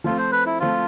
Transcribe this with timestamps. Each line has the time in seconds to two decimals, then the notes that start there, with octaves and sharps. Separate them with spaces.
0.04 F3 A3 C4 F4
0.18 C5
0.32 B4
0.46 E4
0.60 F3 A3 C4 F4